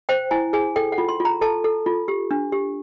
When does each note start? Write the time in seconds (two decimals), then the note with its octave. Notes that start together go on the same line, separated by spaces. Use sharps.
0.09 C5 G5
0.31 E4 G#5
0.53 G#4 G#5
0.76 A4 G5
0.92 F#5
0.98 F4
1.09 C6
1.20 F4
1.25 A#5
1.41 A4 A5
1.64 A4
1.86 F4
2.08 G4
2.31 D4
2.52 G4